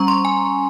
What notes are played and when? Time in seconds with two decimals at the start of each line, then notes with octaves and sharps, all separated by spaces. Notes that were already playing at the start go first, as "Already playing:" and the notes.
Already playing: G3 C#4 A#5 C#6
0.08 C6
0.25 G#5